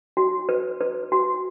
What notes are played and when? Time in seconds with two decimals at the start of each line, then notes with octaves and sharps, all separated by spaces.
0.17 F#4
0.49 B4
0.81 B4
1.12 F#4